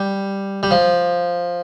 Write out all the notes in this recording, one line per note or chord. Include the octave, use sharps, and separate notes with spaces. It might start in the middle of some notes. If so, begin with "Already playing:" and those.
Already playing: G3
G3
F3